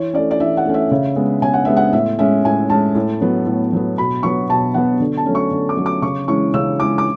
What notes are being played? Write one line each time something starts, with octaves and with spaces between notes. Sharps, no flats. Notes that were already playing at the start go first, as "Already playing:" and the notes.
Already playing: E3 C#5
A3 C#4 D5
D5
E3 E5
F#5
A3 C#4
E5
C#3
G#3 B3
C#3 G#5
F#5
G#3 B3 E5
F#5
A2 E5
G#3 C#4 E5
A2 G#5
G#3 C#4 A5
A2
F#3 B3
A2
F#3 B3
B2 B5
F#3 B3 C#6
B2 A5
F#3 B3 F#5
D3
A5
F#3 A3 C#4
C#6
D3
D6
F#3 A3 C#4
D6
C#3 C#6
E3 G#3 C#4 C#6
C#3 E6
E3 G#3 C#4 D6
D6